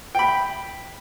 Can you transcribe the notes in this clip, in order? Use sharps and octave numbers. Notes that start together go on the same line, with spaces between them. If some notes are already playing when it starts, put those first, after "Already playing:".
G5 B5